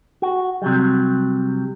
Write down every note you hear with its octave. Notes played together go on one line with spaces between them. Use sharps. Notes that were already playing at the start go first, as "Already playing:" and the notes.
F#4
C3 F#3 G3